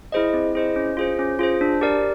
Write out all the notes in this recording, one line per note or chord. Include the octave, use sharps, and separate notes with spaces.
E4 G#4 C5 D#5
C4
E4 G#4 C5 D#5
C#4
F4 G#4 C5
C#4
F4 G#4 C5
D4
G4 A#4 D5